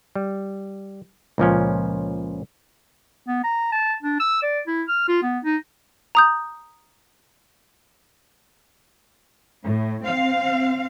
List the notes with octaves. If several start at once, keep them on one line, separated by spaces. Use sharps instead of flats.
G3
C#2 A#2 F3 C#4
B3
A#5
A5
D4
E6
D5
E4
F6
F4
B3
D#4
A#5 D#6 G6
A2
C4 F5